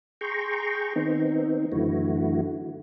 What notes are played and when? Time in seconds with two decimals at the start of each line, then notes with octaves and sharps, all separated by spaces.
0.21 G#4 G5 A#5 C6 C#6
0.96 D#3 B3 C4 D#4
1.72 F#2 D3 E3 A3 E4 F#4